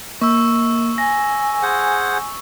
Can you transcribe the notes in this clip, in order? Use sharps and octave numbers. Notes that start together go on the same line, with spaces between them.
A#3 C#6 E6
G#5 A#6
G#4 C5 F#5